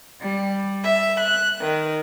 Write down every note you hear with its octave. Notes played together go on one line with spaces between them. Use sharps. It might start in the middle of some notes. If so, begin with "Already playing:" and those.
G3
E5
F#6
D#3